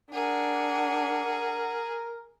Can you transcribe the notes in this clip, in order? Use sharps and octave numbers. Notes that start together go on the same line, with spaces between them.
D4 G#4 A#4 F#5